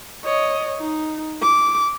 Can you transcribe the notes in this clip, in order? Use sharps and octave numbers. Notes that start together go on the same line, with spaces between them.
C#5 D#5
D#4
D6